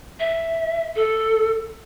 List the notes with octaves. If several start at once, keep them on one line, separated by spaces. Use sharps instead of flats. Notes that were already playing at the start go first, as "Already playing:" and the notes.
E5
A4